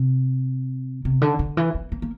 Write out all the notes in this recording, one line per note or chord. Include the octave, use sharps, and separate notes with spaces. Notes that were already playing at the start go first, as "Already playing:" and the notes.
Already playing: C3
C3
D3
D3
E3
A#3
A#3
A#3